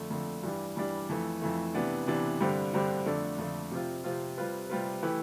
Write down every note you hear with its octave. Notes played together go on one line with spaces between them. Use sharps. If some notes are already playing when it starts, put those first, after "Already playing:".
Already playing: F2 D3 A3
F2 D3 A3
G2 E3 G3 D4
G2 E3 G3 D4
F2 E3 A3
F2 E3 A3
C3 E3 B3 D4
C3 E3 B3 D4
G2 D3 G3 C4
G2 D3 G3 C4
F2 D3 A3 D4
F2 D3 A3 D4
C3 F3 C4 F4
C3 F3 C4 F4
C3 G3 C4 F4 B4
C3 G3 C4 F4 B4
E3 A3 E4 G4 B4